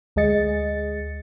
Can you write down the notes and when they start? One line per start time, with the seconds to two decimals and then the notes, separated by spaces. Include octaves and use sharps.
0.16 D2 G#3 G#4 D#5 A6 C#7